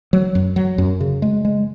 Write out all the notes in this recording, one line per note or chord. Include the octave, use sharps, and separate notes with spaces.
F#3
F#2
F#3
F#2
C#3
G#3
G#3